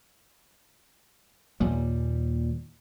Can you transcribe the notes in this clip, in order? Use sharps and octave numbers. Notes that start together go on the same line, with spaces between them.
D#2 A#2 G3